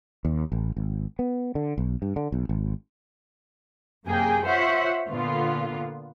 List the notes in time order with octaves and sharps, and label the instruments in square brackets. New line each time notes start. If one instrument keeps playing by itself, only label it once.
[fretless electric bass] D#2
A1
G#1
B3
D3
B1
G2
D3
B1
G#1
[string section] F#2 C3 A#3 G#4 G5
F4 C5 C#5 E5 F#5
A#2 D3 B3 F4